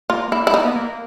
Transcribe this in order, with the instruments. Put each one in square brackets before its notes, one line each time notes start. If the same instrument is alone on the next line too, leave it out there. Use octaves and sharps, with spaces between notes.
[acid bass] A#3 [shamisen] F4
[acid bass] A#3 [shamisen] E4
[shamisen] E4
[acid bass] A#3 [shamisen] D#4
[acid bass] B3
A#3